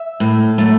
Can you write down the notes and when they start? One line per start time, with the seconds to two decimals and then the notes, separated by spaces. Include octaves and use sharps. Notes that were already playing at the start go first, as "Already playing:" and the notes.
Already playing: E5
0.20 A2
0.58 F#3 A3